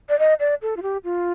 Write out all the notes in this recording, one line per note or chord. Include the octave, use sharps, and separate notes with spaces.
D5
D#5
D5
A4
F4
G4
F4